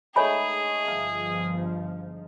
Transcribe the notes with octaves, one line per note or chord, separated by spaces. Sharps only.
G#3 A3 D#4 G#4 C#5 G#5 B5
G1 F3 F5 A#5